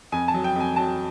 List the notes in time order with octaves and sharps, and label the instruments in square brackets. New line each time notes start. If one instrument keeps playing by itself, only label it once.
[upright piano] F2 G#5
A5
F#3
G5
F2 G#5
F#3 A5